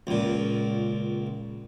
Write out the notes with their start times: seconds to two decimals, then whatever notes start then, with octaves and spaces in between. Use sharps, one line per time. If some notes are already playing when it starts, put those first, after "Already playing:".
0.07 C#2 A#2